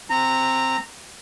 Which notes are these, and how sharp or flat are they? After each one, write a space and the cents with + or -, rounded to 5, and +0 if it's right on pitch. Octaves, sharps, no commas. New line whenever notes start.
C4 +10 A#5 -15